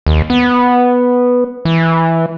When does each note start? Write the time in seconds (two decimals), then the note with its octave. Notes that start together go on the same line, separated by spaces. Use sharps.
0.06 D#2
0.30 B3
1.65 E3